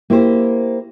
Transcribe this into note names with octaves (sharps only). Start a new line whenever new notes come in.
A#3 E4 G4 C5